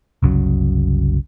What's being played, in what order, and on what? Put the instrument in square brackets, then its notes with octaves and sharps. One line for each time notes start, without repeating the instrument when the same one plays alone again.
[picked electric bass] F#1 C2 C#3 F#3